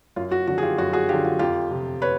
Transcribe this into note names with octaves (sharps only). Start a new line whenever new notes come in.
F#2 F4
F#4
D3 F3 F#4
G#4
F4 G4
F#2 F#4
F#4 G#4
D3 F3 F4 G4
F4
F2 F4 G4
C3 F3
B4 C#5